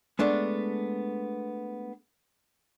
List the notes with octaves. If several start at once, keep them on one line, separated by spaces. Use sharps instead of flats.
G#3 A3 B3 D4